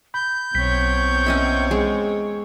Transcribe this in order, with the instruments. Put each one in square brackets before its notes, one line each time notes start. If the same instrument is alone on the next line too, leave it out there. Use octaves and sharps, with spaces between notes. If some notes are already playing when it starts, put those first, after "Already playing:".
[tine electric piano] B5 [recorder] G6
[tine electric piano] B1 B6 [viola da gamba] E2 C4 C#5
[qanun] C#4 D#5 E5
G#3